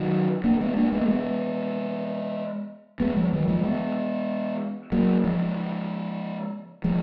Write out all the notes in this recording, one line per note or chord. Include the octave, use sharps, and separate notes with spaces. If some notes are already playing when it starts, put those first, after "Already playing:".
Already playing: D#3 F#3
A#3 D4
G#3 B3
A#3 D4
G#3 B3
A#3
G#3 B3
G#3 B3
F3 G#3
D#3 F#3
F3 G#3
G#3 B3
F#3 A#3
F3 G#3
F3 G#3